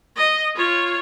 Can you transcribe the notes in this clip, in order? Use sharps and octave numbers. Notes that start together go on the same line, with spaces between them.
D#5
F4 C#5